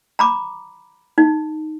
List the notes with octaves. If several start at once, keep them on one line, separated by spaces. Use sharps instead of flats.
A#5 B5 D6
D#4